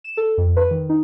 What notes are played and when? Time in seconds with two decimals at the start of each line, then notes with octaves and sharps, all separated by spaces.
0.04 E7
0.17 A4
0.38 F2
0.56 B4
0.71 D#3
0.89 D#4